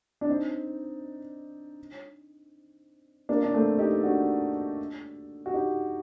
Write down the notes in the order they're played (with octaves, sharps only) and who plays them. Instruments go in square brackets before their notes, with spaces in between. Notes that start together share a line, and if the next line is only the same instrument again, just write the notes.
[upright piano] D4
C4 D#4
A#3 D4
D4
A3 C4
D#4 G4
D4 F#4
F#4
D#4 G4